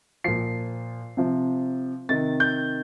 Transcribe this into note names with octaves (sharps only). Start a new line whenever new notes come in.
A#2 F3 C7
C3 F3
C3 D#3 A6
G6